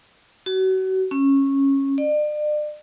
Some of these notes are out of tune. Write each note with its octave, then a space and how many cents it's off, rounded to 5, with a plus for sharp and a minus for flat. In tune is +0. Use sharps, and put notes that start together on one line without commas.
F#4 +35
C#4 -15
D5 +40